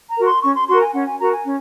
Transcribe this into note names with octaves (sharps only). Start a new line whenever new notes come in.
A#5
F#4 A#4
C6
C#4 C#6
C6
F#4 A#4 C6
G#5
C#4 F#5
G#5
F#4 A#4 A#5
G#5
C#4